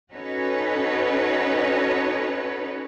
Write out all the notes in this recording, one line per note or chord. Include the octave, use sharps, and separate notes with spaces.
C#4 D#4 F#4 A4 B4 C#5